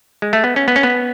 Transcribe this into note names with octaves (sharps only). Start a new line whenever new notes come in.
G#3
A3
B3
C#4
B3
C#4
B3